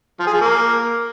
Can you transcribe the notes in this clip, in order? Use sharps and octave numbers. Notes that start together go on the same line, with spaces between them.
F3
G#4
F3
A#3